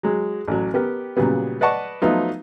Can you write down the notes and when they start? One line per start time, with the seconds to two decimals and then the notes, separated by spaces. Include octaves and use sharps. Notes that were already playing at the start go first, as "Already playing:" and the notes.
0.03 F#3 G#3
0.48 A1 F#3
0.74 B3 G4 A#4
1.17 A#2 C#3 F#3 G3 B3
1.61 B4 D5 D#5 F#5 A5 C#6
2.02 F3 F#3 A3 B3 D#4 F4